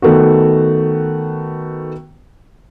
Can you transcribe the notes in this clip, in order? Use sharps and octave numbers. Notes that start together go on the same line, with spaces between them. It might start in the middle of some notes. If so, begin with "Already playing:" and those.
D#3 A3 B3 F#4